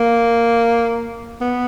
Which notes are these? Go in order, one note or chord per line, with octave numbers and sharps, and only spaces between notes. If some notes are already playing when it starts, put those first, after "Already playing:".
Already playing: A#3
B3